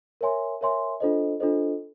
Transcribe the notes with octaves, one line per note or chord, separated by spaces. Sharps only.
A#4 C#5 E5 G#5 C6
A#4 C#5 E5 G#5 C6
D4 F4 A4 C5 D#5
D4 F4 A4 C5 D#5